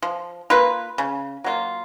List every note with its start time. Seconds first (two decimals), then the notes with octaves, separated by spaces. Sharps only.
0.02 F3
0.50 A#3 F4 B4
0.98 C#3
1.44 F#3 A#3 F4